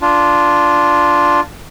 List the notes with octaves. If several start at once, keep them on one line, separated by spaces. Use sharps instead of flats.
D4 F4